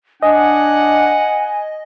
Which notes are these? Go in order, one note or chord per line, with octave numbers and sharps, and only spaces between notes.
D4 D#5 F#5 G#5